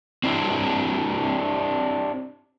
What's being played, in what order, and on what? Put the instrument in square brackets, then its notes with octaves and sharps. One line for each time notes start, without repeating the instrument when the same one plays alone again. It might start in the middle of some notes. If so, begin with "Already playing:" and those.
[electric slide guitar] C4 D4 E4 G4